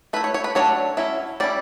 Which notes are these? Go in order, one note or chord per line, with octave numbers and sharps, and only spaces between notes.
A3 E4 B4
C#5
C#5
B4
F#3 A3 D4 C#5
F#3 C#4 E4
G3 C#4 E4 D5